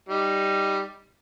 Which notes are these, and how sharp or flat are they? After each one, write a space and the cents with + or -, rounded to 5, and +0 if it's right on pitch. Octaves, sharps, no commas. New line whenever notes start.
G3 +0 D#4 +0